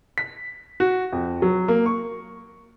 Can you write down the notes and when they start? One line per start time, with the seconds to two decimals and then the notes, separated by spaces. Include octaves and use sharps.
0.18 B6
0.80 F#4
1.12 F2
1.42 F#3
1.68 A#3
1.86 C#6